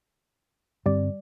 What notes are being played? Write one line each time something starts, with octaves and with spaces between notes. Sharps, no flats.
G2 D3 G3 C4 D5